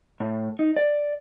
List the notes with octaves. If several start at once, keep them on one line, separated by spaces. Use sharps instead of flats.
A2
D#4
D5